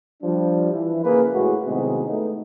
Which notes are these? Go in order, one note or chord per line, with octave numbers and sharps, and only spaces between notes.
F3 G3 D4
E3 E4
C#3 A#3 G#4 B4
A2 G#3 F#4
A2 C3 D#3 F#3 G#3 B3
A3 B3 D#4